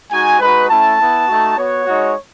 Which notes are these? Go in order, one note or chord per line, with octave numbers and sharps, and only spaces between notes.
G#3 D#4 F#4 G#5
G#3 D#4 F#4 B4
A3 C#4 E4 A5
B3 E4
A3 D#4 F#4
B3 F#4 C#5
G#3 D#4 F#4